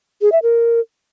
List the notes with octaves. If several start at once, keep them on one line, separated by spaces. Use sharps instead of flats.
G#4
E5
A#4